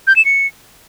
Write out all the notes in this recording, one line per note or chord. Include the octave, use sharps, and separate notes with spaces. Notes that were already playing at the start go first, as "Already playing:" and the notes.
G6
E7
C#7